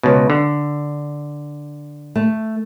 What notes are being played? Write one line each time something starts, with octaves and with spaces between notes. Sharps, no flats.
C#2 B2
D3
A3